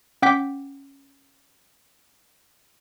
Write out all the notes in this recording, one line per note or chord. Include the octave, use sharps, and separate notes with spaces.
C#4 F#5 G5 D6 G6 B6